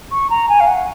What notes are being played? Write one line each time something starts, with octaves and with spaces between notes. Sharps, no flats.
C#6
A#5
G#5
F5
F#5